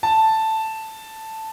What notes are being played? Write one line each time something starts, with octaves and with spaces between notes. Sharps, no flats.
A5